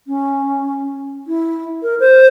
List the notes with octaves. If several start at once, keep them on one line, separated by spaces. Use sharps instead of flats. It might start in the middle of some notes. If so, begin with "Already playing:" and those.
C#4
E4
A#4
C5